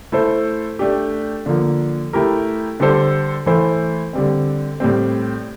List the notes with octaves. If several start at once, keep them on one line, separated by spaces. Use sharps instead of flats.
A3 E4 A4 C5
A3 D4 G4
D3 F3 A#3
A3 E4 G4 A#4
D3 G3 D4 A4 C5
E3 A3 E4 A4 C5
D3 G3 C4
A2 G3 C4